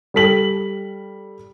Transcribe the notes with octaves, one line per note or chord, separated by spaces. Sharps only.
G3 A4 B6 F#7